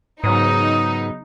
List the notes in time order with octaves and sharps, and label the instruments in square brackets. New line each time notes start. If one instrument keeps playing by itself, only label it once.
[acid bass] G#2 [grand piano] C#3 F#3 B3 [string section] D#4 [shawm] D#6